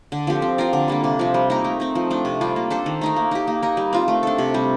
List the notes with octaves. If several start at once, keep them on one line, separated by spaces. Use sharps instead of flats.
D3
F3 C4 G4
C4
F4 A#4 D5
D3
G3 A#3 D4
C3
F3 C4
G3
A#3 D#4 A#4
A3
C4 D#4
F3
A3 D4
C3
G3 D4 F4
A#3
D4 A4 C5
D#3
A3 D#4 A#4
A#3
D#4 G4
A#3
D#4 A#4
G3
C4 F4
A3
D4 A4
C3
G3 C4